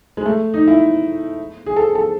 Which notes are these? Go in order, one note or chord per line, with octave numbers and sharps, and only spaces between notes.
G#3
A3
D#4
E4
G#4
A4
A4